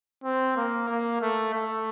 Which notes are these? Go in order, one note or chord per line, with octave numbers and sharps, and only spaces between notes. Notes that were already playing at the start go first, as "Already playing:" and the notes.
C4
A#3
A#3
A3
A3